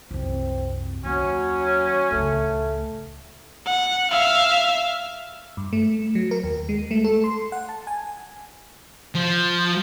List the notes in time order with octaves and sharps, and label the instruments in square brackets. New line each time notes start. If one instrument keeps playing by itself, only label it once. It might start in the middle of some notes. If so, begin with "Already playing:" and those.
[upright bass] C2 F#2 [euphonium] C4
[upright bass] D#2 A#3 [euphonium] F#3 [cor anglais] C#4
[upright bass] C#2 A2 [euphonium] A3
[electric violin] F#5
E5 F5
[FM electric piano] G2
A3
F#3
A#4
D#2
G#3
A3
A4
C6
F#5
A5
G#5
[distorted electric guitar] F3